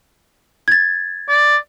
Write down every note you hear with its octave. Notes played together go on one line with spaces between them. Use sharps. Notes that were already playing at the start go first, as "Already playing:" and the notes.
G#6 A6
D5